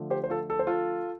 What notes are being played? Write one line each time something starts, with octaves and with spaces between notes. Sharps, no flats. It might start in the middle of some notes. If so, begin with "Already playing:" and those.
Already playing: D3 F3 A3
G4 C5
C5
F4 A4
A4
C5
F4 A4